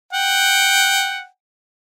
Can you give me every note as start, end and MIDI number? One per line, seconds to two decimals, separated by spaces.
0.13 1.26 78
0.13 1.26 79